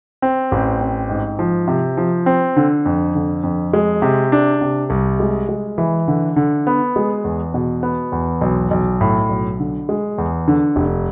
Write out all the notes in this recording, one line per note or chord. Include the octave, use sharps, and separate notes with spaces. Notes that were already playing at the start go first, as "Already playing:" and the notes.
C4
A1
C4
G#2
F3
C3
F3
C4
D3
F2
D3
F2
G#3
C3
D4
C3
C2
G#3
G#3
E3
D3
D3
B3
G#3
E2
B2
B3
E2
B1
B1
A2
B1
D3
G#3
E2
D3
F1